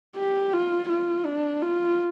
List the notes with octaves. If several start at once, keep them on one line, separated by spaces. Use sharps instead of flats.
G4
F4
F4
D4
F4